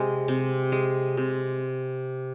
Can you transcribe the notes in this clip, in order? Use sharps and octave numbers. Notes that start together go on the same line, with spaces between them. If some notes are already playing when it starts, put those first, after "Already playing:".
Already playing: C3 G#3
C3
G#3
C3